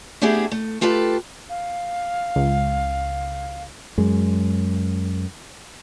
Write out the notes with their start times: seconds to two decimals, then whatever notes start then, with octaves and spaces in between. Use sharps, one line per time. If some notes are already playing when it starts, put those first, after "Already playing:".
0.22 A3 B3 D4 E4 G4 G#4
0.52 A3
0.81 A3 F4 G4 A4 B4
1.49 F5
2.36 C#2
3.98 F#2 G#3